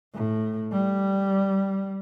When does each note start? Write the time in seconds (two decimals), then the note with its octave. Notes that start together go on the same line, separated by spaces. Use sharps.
0.14 A2
0.72 G3